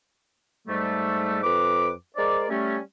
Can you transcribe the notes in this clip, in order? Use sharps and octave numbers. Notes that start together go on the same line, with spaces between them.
G#2 G3 A3
F2 B4 D6
G#3 A#4 C5 D5
G3 A3 C#4